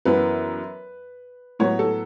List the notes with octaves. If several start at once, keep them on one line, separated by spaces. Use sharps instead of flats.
F#2 E3 B3 B4
A2 F#3 B3 C#5
A4